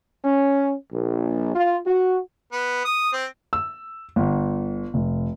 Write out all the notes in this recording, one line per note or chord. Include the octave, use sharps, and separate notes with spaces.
C#4
A#1
F4
F#4
B3
D#6
C4
E6
G1
F1